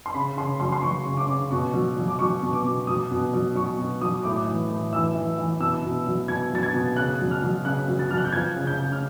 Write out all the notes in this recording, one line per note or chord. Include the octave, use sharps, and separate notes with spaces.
C6
C#3 B5
C#3 C6
F#3 C6
C6
F#3 C#6
C#3
D6
C#3
B2 C#6
F#3
F#3
D6
F#3 C#6
B2
D6
B2
F#3 D#6
B2
F#3
F#3 C#6
B2
F#3 D#6
A2 D6
E3
A2
E3 E6
E3
E3
B2 E6
B2
F#3
B2 G#6
F#3 A6
G#6
B2
C#3 F#6
F#3
F6
F#3
C#3 F#6
F#3
A6
F#3 F6
F#6
G6
F3 G#6
C#3
G6
C#3
F6